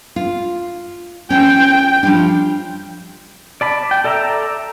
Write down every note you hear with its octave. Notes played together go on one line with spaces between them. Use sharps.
F4
C#4 G5
F3 G3 D4
D5 A5 B5
G5
A4 D5 E5 A#5 E6